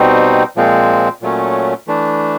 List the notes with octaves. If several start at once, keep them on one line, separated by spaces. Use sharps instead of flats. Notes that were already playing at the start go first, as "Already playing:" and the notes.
Already playing: B2 G3 C4 D#4
A#2 F3 G#3 C4
A#2 F#3 A3 C#4
E3 A3 D4